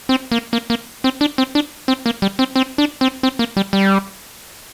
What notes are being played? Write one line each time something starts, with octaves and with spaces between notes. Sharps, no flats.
C4
A#3
A#3
A#3
C4
D4
C4
D4
C4
A#3
G3
C4
C4
D4
C4
C4
A#3
G3
G3